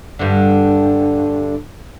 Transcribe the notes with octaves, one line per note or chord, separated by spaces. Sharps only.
G2 D3